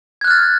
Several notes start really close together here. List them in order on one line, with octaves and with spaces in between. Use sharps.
G#6 F#6 F6 A6